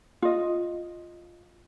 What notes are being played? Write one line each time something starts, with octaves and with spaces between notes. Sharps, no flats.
F4 D#5